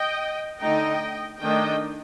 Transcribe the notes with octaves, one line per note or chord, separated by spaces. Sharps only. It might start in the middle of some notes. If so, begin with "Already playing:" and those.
Already playing: D#5 G5
D3 A3 D#4 D#5 G5
D#3 A3 D4 D#5 G5